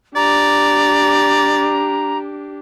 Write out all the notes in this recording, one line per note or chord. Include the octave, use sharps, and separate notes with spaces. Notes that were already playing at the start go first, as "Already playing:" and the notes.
D4 G4 D5 A#5